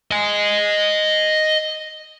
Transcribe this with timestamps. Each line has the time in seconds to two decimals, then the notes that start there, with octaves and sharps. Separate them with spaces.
0.11 D#5 G#5